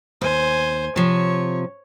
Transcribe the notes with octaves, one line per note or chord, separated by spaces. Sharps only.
D#2 C5 G#5
C3 F3 C#5